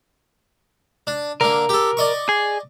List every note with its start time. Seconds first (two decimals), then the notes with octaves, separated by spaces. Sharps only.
1.07 D4
1.41 D3 A#3 A#4
1.69 G4 A4
1.97 D5 D#5 C#6
2.29 G#4